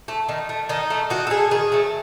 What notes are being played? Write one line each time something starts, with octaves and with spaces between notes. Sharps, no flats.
A3
D#3
A3
D#3 D#4
A3
D#3 F#4
A4
A3 G#4
D#3 G#4
F#3 A3